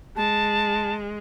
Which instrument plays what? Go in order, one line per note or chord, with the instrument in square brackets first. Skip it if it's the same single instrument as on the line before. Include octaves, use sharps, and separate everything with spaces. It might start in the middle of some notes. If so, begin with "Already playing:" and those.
[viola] G#3 [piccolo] A5